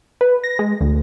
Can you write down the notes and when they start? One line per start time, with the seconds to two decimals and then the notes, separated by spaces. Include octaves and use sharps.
0.21 B4
0.44 A#6
0.59 G#3
0.81 D2